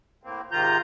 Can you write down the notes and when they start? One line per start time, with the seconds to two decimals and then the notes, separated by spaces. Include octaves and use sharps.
0.23 A2 A#3 C4
0.52 G#2 C3 D#3 F4 A#5 G6